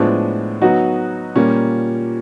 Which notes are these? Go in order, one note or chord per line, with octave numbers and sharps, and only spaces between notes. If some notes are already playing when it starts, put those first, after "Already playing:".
Already playing: A2 F3 G#3 B3 D4
F#3 B3 D#4 F#4
A#2 G3 A#3 C#4